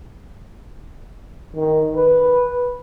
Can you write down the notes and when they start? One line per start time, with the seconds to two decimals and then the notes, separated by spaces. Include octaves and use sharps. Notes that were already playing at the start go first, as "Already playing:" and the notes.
1.56 D#3
1.96 B4